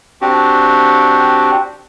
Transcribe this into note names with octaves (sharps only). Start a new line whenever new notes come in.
C4 D4 F#4 G4